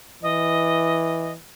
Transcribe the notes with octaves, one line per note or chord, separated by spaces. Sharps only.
E3 D#5